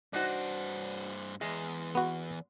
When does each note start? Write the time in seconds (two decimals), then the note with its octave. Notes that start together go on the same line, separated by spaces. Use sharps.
0.13 G2 D4 D#4 F#4 C5
1.41 E2 G#3
1.95 B3 F#4